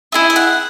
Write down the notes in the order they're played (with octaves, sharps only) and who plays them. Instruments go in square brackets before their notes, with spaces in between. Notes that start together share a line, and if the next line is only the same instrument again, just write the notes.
[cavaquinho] E4 G#4 D#5 E5
E5
F#5